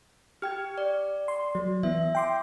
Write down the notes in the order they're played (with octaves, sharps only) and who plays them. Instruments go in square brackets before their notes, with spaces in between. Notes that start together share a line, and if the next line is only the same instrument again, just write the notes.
[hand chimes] G4 G5 [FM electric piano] F6 G#6
[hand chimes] D5
[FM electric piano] C6
F#3
[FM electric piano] E3 B3 [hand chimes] E5
[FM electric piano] G5 C6 D6